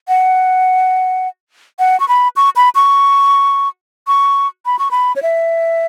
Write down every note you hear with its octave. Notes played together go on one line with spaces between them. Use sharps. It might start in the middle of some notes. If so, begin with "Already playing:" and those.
F#5
F#5
C#6
B5
C#6
B5
C#6
C#6
B5
C#6
B5
C#5
E5